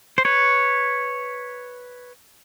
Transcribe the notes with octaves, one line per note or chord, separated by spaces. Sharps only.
C5
B4 C#5